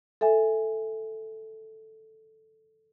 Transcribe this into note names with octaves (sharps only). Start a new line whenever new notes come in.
A4 E5 G#5